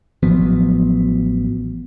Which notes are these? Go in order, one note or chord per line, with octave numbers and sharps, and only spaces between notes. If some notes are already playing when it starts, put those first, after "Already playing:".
A1 F3 F#3 B3